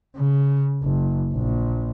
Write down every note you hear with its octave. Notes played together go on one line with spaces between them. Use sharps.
C#3
F#1
A#1